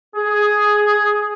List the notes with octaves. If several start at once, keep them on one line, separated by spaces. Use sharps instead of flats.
G#4